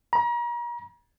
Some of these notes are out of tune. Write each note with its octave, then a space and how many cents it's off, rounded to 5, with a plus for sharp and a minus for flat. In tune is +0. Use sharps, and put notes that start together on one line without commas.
A#5 +40